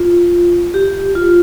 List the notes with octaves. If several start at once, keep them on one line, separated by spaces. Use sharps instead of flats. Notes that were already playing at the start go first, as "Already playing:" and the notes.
Already playing: F4
G4
F4